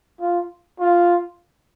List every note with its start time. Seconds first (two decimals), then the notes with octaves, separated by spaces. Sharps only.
0.21 F4
0.79 F4